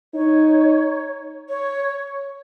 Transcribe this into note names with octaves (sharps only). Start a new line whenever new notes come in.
D#4 C#5
C#5